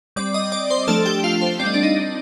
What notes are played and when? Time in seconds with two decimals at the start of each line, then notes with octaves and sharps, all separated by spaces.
0.16 G3 C4 D5 D6
0.34 D#5 D#6
0.52 D5 D6
0.70 C5 C6
0.87 F3 A3 D4 A4 A5
1.06 G4 G5
1.24 F4 F5
1.41 C5
1.59 C4 D5
1.63 G3 D#5
1.74 D4 D5
1.83 D#4 D#5